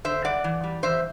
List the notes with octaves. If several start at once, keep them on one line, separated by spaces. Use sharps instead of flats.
D3 C5 E5
G3 D5 F#5
E3
G3
E3 C5 E5